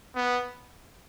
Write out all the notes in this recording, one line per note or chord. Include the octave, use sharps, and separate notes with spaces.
B3